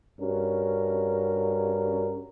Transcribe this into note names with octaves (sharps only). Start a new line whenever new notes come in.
G2 C#4 F#4 A#4